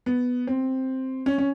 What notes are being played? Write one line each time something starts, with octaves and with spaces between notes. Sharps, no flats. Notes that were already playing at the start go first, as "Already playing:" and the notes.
B3
C4
C#4
C#4